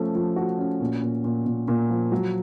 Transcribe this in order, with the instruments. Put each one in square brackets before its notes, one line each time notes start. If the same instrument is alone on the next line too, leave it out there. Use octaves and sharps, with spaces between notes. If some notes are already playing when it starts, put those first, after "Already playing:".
Already playing: [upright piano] F3 A3 C#4
F3
F#4
C#4
A#2
A#2
A#2
A#2
A#2
F3
F#3